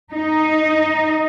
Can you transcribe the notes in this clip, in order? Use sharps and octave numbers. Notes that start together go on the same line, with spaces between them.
D#4